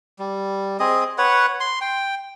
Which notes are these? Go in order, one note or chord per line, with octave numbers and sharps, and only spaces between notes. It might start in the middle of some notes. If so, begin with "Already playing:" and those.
G3
C4 G#4 D#5
B4 C#5 F#5
C6
G5